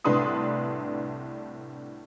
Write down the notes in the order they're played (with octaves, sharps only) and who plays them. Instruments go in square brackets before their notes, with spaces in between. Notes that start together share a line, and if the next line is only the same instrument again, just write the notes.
[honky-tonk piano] C2 A2 D4 B4 C6 D#6